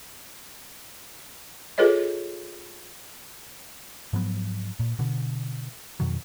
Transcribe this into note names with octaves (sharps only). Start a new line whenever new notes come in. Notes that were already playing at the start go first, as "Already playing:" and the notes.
F4 G#4 A4 B4 C#5 D#5
G#2 F3 F#3 B3
A#2
B2 D3
F2 B2 D#3 F#3